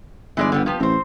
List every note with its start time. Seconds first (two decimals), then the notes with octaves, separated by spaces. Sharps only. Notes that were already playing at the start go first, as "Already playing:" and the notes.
0.37 G1 E3 G#3 D5
0.52 D3 G3 B3
0.66 F3 B3 G4
0.80 A1 C4 C5